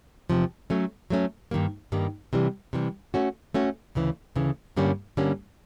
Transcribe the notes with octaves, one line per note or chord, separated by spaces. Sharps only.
E2 C3 F3
F#3 A3 C#4
F#3 A3 C#4
G2 D#3 G3 A#3
G2 D#3 G3 A#3
C3 E3 G3
C3 E3 G3
A3 C#4 F#4
A3 C#4 F#4
D2 C#3 E3
D2 C#3 E3
G2 D3 G3 A#3 C#4
G2 D3 G3 A#3 C#4